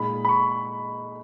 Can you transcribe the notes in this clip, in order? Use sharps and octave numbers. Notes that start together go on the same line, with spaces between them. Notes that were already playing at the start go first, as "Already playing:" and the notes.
Already playing: A#2 G#3 D#4 B5
B5
C#6